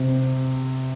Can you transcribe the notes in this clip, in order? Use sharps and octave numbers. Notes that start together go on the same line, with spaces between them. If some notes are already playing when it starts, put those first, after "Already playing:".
Already playing: C3